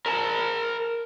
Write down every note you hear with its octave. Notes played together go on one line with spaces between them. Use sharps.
A#4 A5